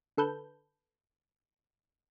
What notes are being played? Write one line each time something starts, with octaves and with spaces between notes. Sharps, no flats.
D3 A4 B4 G6